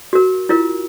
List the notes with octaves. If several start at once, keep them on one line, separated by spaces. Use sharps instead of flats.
F#4 A#4
E4 F4 A#4